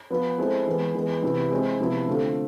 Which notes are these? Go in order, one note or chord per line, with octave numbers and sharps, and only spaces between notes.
F3 B3 F4 B4
G#3 C4 E4 A4 C5
E3 G#3 B3
E3 G#3 B3
C3 E3 B3 E4
G#3 C4 E4
C3 F3 B3 E4
D3 A3 C4 F4 A4